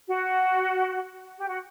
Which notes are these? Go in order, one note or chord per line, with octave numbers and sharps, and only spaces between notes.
F#4
G4
F#4